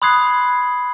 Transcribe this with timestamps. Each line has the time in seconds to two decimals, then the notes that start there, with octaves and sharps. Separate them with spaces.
0.02 B5 C6 D#6 F#6 G#6 C7